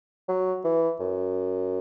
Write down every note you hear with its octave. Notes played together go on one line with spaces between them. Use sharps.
F#3
E3
F#2